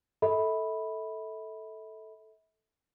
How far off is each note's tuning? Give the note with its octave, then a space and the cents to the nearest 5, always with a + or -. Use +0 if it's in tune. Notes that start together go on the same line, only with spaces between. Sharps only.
A4 +0 E5 -45 B5 +0